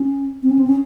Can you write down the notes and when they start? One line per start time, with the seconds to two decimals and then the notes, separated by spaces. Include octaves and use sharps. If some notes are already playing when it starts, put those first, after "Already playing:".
Already playing: C#4
0.43 C4
0.51 C#4
0.59 C4
0.67 C#4